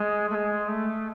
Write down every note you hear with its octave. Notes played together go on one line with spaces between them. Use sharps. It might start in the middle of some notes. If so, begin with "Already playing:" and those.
Already playing: G#3
A3
G#3
A3